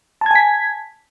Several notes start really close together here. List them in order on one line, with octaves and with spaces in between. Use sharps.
A5 G#6 G#5 B6